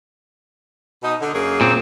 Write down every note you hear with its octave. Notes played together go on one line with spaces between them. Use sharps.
B2 D#4
D3
F#2 A#3 G#4
A#2 C4